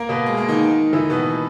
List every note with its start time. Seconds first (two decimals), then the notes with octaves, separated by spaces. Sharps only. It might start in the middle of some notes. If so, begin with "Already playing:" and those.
Already playing: A#3 A#4
0.09 B2 B3
0.26 G#3
0.37 A#3
0.48 D#3 D#4
0.93 E3 E4
1.09 B2 B3